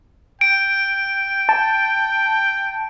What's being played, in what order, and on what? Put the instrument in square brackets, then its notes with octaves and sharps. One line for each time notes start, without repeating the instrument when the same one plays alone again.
[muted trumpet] G5 [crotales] D7
[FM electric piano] A5